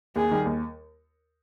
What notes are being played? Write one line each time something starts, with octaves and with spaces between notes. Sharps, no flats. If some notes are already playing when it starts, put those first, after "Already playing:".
D#2 G#4
D#3 G3
D#2